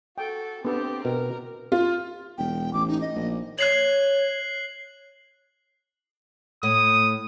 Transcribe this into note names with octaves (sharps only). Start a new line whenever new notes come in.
F#4 A4 G5
B3 C4 D4 G4 A4
B2 A#4
F4
E1 G5
A1 D6
D#4
D#5
A#1
C#5 F#6 C7 F#7
A2 D#6